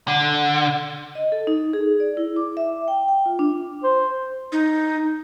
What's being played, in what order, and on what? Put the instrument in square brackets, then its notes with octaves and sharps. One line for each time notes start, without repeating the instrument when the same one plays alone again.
[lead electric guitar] D3
[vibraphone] D#5
A4
D#4
G#4
D5
E4
D6
E5
G5
G5
F4
D4
[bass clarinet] C5
[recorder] D#4